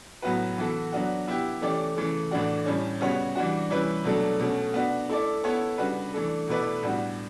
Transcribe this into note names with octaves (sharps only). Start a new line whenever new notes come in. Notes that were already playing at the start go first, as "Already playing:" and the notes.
A2 F#3 B3 F#4 B4
E3 B3 F#4 A4
F#3 B3 D4 F#4
B3 E4 G4
E3 A3 C#4 G4 D5
C#3 E3 A3
A2 E3 A3 D4 F#4
A2 G3 C#4
C#3 G3 B3 F#4 C#5
E3 G3 D4 F#4
E3 G3 C#4 E4 B4
B2 F#3 A3 D4 A4
B2 A3 C#4
B3 D4 F#4
A3 E4 A4 D5
B3 E4 A4 C#5
C#3 G3 D4 F#4 B4
E3 A3 D4 A4
B2 A3 E4 B4 D5
A2 G3 B3 D4 F#4